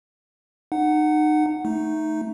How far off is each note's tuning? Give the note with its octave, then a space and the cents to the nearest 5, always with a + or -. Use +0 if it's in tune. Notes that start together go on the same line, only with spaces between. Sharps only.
D#4 -30 F#5 +0
A3 +0 D#4 +0